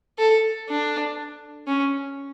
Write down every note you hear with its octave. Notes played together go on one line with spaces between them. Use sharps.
A4
D4
C#4